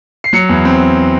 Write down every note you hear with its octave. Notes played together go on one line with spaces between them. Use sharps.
C7
F#3 C#7
E2
C4